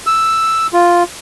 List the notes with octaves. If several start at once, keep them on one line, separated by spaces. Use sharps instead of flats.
E6
F4